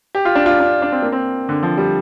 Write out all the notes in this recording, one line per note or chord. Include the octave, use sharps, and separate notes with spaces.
G4
F4
D4
F4
D4
D4
C4
A#3
C4
D3
F3
G3